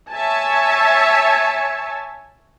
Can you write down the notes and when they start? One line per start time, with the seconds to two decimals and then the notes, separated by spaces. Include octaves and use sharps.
0.11 C#5 E5 G#5 A5